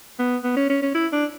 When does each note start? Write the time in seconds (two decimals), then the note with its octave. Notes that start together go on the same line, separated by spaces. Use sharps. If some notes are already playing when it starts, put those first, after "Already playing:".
0.19 B3
0.44 B3
0.56 C#4
0.70 C#4
0.82 C#4
0.95 E4
1.12 D4